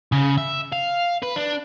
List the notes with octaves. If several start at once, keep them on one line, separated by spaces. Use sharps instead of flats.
C#3
E5
F5
B4
D4